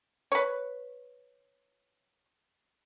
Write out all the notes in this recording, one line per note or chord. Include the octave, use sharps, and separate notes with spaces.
B4 C#5